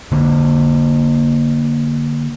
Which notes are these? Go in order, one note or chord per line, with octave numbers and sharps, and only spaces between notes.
D3 A#3